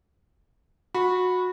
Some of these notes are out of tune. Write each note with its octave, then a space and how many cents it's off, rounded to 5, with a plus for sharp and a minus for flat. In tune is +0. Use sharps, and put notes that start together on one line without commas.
F#4 -20 B5 +0